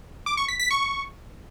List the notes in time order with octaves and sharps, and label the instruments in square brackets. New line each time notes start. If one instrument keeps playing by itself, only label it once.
[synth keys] D6
C#6
B6
B6
C#6